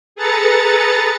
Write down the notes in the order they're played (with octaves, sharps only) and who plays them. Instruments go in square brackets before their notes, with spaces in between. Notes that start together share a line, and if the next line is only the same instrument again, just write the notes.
[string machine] G#4 A4 B4 A#5 A6 C#7